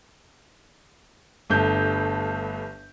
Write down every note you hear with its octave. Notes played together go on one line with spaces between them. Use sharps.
G1 G2 A3 G6